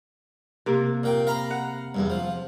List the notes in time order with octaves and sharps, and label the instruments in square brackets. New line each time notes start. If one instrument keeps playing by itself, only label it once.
[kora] C3 A#3
[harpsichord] A#2 G5
F5 A#5 B5
[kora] F#5
[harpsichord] E2 G2
F3